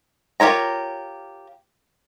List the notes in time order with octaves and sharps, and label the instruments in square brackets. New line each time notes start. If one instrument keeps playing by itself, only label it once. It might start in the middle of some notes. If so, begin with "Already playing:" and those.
[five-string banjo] F4 G4 A#4 C#5 A#5